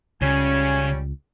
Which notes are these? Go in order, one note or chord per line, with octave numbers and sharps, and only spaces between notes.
C#2 C#3 G3 C#4 G#5